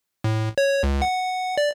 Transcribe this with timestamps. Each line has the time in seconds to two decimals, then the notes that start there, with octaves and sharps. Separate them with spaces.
0.24 A2
0.58 C#5
0.83 C#2
1.02 F#5
1.58 D5